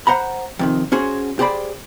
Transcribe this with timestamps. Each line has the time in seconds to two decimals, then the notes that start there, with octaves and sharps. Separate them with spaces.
0.07 C5 F#5 A#5 B5
0.59 F2 C3 D#3
0.92 C#4 F#4 G#4 C5
1.39 G4 G#4 C5 D5 B5